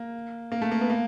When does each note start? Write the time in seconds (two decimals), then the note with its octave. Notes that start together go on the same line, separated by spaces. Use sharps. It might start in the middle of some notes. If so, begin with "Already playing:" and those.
Already playing: A#3
0.52 A#3
0.62 A3
0.71 A#3
0.81 B3
0.90 A#3